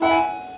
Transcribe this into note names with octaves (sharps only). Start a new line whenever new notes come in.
E4 F#5
G#5